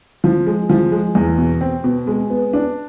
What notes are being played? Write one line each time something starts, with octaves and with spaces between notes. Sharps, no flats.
F3
G#3
F3
G#3
E2
B2
C4
B2
G#3
B3
D4